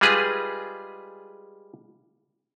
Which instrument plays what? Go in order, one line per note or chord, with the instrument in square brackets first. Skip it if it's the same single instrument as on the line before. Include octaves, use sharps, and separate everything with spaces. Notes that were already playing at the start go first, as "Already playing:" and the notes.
[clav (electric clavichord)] G3 G#3 F4 G#4 B4